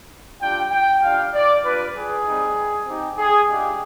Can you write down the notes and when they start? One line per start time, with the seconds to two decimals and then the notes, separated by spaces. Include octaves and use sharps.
0.40 G3 D4 F4 G5
0.71 G5
1.01 G3 D4 F4 F5
1.33 D5
1.63 G3 D4 F4 B4
1.95 G#4
2.24 G3 C4 D#4
2.86 C4 D#4 G4
3.18 G#4
3.48 G#3 D4 F4 G4